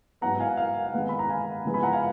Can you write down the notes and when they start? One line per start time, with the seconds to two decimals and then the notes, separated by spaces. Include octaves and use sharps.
0.21 G#2 F#3 B3 F#5 A#5
0.39 F5 G#5
0.57 F5
0.86 F5
0.93 F2 D#3 G#3 B3 F#5
1.09 B5
1.19 A#5
1.29 F5 G#5
1.65 C#3 F3 G#3 B3
1.74 G#5 B5
1.83 F#5 A#5
1.93 F5 G#5